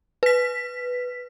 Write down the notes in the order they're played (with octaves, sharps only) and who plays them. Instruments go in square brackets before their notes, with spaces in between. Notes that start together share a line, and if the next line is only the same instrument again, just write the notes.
[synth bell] B4 B6